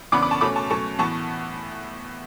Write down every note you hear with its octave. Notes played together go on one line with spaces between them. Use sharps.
C#3 E3 B3 D4 B5 D6
B5 D6
A5 C#6
B2 A3 C#4 B5 D6
A5 C#6
B2 F#3 A3 C#4 A5 C#6
A2 E3 B3 A5 C#6